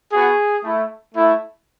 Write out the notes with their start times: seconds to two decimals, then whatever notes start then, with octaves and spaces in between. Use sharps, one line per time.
0.12 B3 F#4 G#4
0.64 A3 E4
1.15 A3 E4